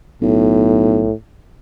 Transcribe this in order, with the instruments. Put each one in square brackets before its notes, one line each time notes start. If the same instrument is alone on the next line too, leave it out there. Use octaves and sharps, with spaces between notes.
[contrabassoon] B1 [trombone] A2